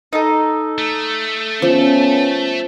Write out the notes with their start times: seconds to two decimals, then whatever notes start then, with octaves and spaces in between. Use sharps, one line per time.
0.13 D#4 A4
0.78 A3
1.62 F3 B3 C#4